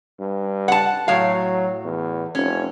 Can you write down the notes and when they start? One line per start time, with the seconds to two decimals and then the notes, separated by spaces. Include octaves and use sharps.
0.20 G2
0.68 F#5 A5
1.08 A2 F#3 F5
1.84 E2
2.35 F1 C#4